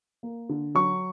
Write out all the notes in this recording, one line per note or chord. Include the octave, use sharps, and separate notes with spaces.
A#3
D3
F#3 C#6